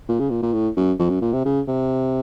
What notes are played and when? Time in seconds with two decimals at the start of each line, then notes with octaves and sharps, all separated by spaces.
0.09 A#2
0.20 C#3
0.30 A#2
0.43 A#2
0.53 A2
0.77 F#2
0.99 F2
1.10 F#2
1.22 A#2
1.33 C3
1.45 C#3
1.68 C3